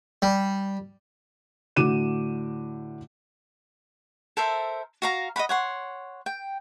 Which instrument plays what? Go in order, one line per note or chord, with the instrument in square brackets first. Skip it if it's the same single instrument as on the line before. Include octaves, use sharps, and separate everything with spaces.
[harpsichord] G3
[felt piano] A2 D3 F#4 D6 D#7 E7
[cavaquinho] A4 A#4 C5 E5
F#4 F5 A#5
D#5 F5 F#5 B5
C#5 F#5 C6
G5